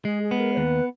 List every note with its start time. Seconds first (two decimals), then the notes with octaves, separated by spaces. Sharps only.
0.04 G#3 G#4
0.23 G#4
0.31 B3
0.40 A#4
0.53 C#5
0.57 D#2 B4